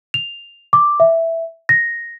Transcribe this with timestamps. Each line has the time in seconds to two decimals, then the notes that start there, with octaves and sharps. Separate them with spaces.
0.14 F7
0.73 D6
1.00 E5
1.69 A#6